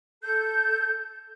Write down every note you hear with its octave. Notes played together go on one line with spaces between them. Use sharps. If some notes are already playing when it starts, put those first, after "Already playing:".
A4 G6